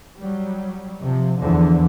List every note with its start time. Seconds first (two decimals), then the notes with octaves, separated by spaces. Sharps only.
0.19 F#3 G3
1.02 C3 F3
1.41 E2 D3 E3 F3